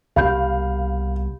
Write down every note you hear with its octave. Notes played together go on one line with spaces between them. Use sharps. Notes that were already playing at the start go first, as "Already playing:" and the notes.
C2 B2 A#3 G4 F5 B5 G6